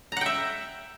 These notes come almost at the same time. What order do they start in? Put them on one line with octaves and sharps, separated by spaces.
A#5 F#5 G5 E5